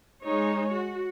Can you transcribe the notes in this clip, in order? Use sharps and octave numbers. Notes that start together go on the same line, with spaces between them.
G#3 D#4 C#5
F#4